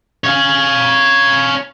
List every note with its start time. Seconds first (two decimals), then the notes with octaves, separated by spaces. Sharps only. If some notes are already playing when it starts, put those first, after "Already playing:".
0.24 C#5 F5